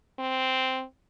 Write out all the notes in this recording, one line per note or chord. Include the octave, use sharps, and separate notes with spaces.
C4